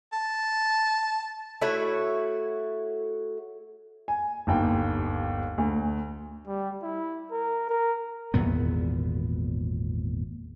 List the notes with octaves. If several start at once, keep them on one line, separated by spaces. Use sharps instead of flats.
A5
A3 E4 F#4 C#5
G#5
G1 D#2 G5
D2
G3
E4
A#4
A#4
G#1 E2 A#2 B3